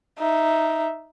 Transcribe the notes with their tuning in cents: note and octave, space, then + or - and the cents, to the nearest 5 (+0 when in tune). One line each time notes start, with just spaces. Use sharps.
D#4 +0 E5 +0